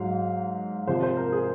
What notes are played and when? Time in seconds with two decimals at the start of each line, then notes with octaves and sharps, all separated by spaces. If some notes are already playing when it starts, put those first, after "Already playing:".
Already playing: G#2 F#3 F5
0.87 C3 F3 G#3 C5
1.03 C5
1.17 A#4
1.32 G#4